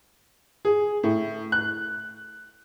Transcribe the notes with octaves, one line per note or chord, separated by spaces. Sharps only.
G#4
A2
F#6